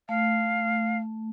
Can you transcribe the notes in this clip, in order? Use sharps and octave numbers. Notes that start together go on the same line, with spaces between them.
A3 F5